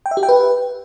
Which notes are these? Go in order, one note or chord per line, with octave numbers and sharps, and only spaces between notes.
G5
E5
G4
G5
B4